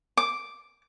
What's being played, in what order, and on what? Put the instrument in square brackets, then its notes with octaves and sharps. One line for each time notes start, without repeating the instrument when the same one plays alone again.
[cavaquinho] D6